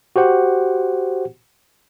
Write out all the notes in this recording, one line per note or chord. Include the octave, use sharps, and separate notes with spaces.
F#4 G4 C5 F#5